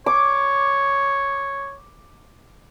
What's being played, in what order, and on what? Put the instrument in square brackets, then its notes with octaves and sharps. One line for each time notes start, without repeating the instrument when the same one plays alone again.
[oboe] C#5 [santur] D6